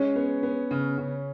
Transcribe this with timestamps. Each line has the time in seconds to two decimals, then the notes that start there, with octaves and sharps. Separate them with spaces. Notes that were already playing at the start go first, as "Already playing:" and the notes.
Already playing: G#3 C#4 C#5
0.16 B3
0.43 B3
0.71 C#3
0.98 C#3